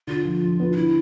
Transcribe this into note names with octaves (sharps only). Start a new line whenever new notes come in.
D3 F4
F3
F3
B3
D4
D3 E4